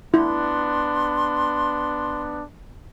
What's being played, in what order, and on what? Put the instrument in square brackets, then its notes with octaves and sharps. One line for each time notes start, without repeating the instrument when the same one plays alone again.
[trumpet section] B3 D4 [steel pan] E4 [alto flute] C6